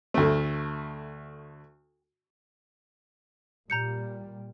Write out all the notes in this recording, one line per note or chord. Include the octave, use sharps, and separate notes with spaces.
D2 A3
A#2 G3 A#5 G6 C#7